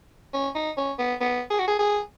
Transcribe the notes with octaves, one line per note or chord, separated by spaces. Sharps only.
C#4
D#4
C#4
B3
B3
G#4
F#4
G#4
G#4